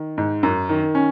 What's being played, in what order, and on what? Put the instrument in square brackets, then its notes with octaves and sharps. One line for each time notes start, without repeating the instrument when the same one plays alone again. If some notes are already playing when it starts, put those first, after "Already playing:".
Already playing: [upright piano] D#3
G#2
F#2
D#3
C#4